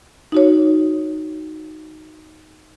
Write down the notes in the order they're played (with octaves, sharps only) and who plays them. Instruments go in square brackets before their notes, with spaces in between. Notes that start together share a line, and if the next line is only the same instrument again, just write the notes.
[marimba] D#4 F#4 C#5